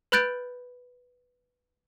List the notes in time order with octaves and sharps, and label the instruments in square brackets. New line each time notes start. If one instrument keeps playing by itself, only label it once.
[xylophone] B4 B5 F#6 G6 A6 D7